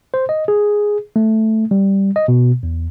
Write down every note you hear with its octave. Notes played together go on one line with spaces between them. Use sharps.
C5
D#5
G#4
A3
G3
D#5
B2
E2